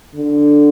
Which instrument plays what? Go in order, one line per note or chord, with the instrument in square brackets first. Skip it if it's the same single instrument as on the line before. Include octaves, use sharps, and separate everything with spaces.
[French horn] D3